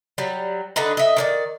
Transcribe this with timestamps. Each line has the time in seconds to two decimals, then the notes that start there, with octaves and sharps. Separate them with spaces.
0.18 F#3 G3
0.76 D3 D4 D#4 B4
0.97 D#5 E5
1.17 D#3 C5 D5